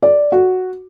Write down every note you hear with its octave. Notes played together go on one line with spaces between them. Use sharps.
D5
F#4